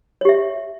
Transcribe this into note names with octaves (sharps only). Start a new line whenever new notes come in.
G4 C#5 E5